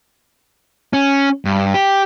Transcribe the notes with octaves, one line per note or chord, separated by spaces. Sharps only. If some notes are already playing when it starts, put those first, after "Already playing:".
C#4
G2
G4